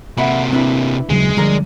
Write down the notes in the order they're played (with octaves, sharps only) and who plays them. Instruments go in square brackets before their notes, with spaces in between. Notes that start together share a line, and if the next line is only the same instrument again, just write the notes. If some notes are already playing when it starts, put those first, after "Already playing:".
[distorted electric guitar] C3 A#3 [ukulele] E5 F#5 B5
[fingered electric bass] C4 [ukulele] D4 E4 B4
[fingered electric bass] D#1 C#3 F#3 [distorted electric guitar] G#3
[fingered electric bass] D3 F3 G3 [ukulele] G#4 A#4 D5